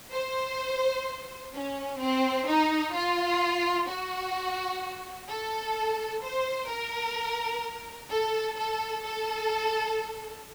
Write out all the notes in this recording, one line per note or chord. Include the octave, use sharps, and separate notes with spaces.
C5
C#4
C4
D#4
F4
F#4
A4
C5
A#4
A4
A4
A4